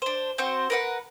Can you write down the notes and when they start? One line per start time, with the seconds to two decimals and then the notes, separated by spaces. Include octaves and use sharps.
0.02 D4 C5
0.38 C4 F#4 C5
0.70 A#4 B4 F#5